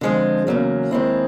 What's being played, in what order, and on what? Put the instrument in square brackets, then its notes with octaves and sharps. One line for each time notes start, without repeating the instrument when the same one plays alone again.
[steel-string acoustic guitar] D3 F3 G#3 C4
E2 C#3 F#3 A#3
D#2 D#3 G#3 C4 E4